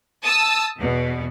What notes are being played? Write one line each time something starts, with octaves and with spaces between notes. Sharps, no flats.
A5 D#6 E6
E2 B2